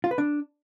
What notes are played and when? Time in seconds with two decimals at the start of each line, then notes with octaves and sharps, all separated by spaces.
0.04 F4
0.11 B4
0.18 D4